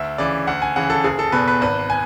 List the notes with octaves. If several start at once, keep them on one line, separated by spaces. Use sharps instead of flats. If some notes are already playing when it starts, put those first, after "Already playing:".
Already playing: D2 E5
C#3 E3 D5
D2 F#5
G#5
C#3 E3 F#5
A4
F#1 G#4
A4
E2 B2 B4
B4
G#1 B4
G#5